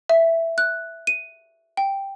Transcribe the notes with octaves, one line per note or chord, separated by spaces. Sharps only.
E5
F#6
D#7
G5